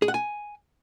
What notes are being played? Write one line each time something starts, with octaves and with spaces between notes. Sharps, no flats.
G#4
F#5
G#5